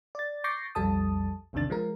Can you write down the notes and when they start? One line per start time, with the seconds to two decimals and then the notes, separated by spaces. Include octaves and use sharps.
0.15 D5 A6
0.44 C#6 D6 G6 A6 A#6 C7
0.75 B1 F2 G3 A4 A5 D#6
1.53 A#1 E2 C3 D#3 D4 A6
1.70 F3 G#3 A#4